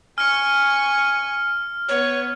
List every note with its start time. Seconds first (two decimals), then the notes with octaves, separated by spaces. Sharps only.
0.18 G#5 C#6 F6
1.89 B3 C#5